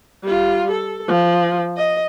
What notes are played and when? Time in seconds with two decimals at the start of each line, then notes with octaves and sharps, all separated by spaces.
0.23 G3 F4
0.71 A4
1.08 F3
1.77 D#5